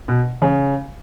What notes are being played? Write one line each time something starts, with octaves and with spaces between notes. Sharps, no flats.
B2
C#3